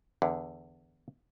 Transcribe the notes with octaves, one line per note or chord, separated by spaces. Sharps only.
E2 D3